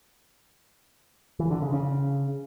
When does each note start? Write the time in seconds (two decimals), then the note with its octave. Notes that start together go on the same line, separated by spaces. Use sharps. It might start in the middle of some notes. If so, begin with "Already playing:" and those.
1.39 E3
1.51 D3
1.62 C#3
1.73 C#3